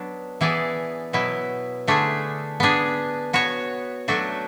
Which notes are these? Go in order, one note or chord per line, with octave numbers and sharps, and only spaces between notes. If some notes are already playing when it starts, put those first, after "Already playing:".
Already playing: F#3 B3 D4
E3 B3 E4 G#4 D5
B2 F#3 B3 E4
D3 A3 D4 G#4
B3 D4 G#4
B3 F#4 C#5
F#3 A3 D4 F#4